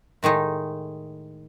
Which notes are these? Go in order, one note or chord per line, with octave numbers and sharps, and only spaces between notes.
A2 D#3 G#3 D#4